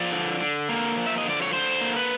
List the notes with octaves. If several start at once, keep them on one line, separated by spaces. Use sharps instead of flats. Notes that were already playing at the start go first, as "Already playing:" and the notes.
Already playing: F3 D5
D3
D3
A#3
F3
E5
D#5
D3
D5
C#5
D3 C5
A#3
B4